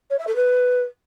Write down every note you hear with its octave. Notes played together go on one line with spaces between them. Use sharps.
C#5
E5
A4
B4